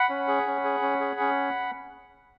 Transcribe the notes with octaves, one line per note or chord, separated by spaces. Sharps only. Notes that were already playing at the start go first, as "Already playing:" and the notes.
Already playing: F#5 B5
C#4
G#4
C#4
G#4
C#4
G#4
C#4